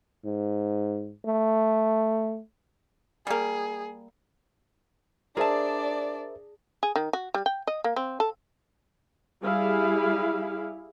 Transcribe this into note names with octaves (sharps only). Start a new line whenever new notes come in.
G#2
A3
G3 A#3 G#4
D4 G#4 A#4 C5 D5 E5 A5
G#4
D#3
F#4
G3
G5
D#5
A#3
C4
A4
G3 E4 G#4 F5